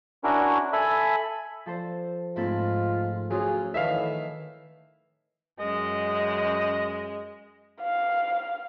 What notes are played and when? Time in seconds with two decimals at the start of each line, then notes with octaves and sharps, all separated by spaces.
0.24 C#4 D4 E4 F#4 A#4
0.73 A4 E5 G#5 B5
1.66 F3 A4 C5
2.36 G#2 A3 C4 F4 A4 B5
3.31 C#3 F#3 F4 G#4
3.74 A2 D#3 E3 D#4 E5 F5
5.59 F#2 G#3 D#5
7.81 F5